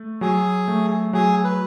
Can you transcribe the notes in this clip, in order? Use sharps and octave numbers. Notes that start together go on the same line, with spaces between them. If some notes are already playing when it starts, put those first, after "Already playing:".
Already playing: A3
F#3 G#4
A3
F#3 G#4
B4